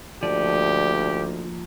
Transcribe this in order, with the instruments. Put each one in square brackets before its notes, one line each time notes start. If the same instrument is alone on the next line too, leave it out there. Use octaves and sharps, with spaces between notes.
[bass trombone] D2 [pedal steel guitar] F3 A#3 D#4 [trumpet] G4 [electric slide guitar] D5